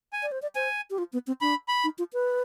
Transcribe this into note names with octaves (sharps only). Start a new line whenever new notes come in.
G#5
D5
C5
D5
C5 G#5
G4
F4
B3
C4
D4 B5
B5
D#4
F4
B4